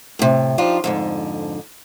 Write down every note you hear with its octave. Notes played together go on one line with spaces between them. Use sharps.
A2 C3
F3 D4 D#4 F4 G4
F2 G#2 D3